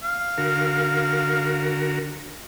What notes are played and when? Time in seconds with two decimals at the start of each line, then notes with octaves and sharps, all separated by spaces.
0.03 F5
0.38 D3 F#4 A#4